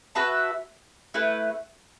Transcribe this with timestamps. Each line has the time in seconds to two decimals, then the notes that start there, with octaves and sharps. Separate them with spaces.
0.15 F#4 B4 E5 A5
1.14 A3 E4 B4